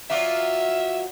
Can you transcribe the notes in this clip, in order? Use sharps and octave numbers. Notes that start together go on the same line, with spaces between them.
F#3 F4 D5 E5